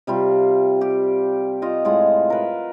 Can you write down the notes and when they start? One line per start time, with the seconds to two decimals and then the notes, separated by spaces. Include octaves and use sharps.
0.07 C3 G3 F4
0.81 G4
1.62 F4 D#5
1.85 A2 G#3 F4 F#5
2.30 A#4 B4